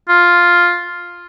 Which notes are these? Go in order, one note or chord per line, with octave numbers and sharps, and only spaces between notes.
F4